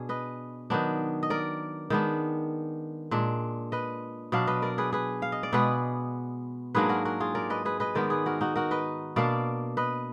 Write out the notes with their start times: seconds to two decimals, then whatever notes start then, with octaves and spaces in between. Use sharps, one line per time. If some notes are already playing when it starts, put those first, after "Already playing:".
Already playing: B2 D4 G#4
0.09 B4 D#5
0.70 D#3 F#3 B3 D4
1.23 D#5
1.30 A#4 D5
1.90 D#3 G#3 B3 D4
3.11 A#2 G#3 D4
3.72 B4 D#5
4.32 B2 F#3 D4 D5 F5
4.47 B4 D#5
4.62 A#4 D5
4.78 G#4 B4
4.93 G#4 B4
5.22 F5
5.32 D#5
5.43 D5
5.53 B2 G#3 B3 G#4 B4
6.75 G#2 F#3 A#3 D4 G#4 B4
6.89 F#4 A#4
7.05 F#4 A#4
7.20 F4 G#4
7.35 A#4 D5
7.50 B4 D#5
7.65 G#4 B4
7.80 B4 D#5
7.95 D#3 G#3 B3 A#4 D5
8.10 G#4 B4
8.26 F#4 A#4
8.41 D#4 F#4
8.56 F#4 A#4
8.71 B4 D#5
9.16 B2 A#3 D4 D5 F5
9.77 B4 D#5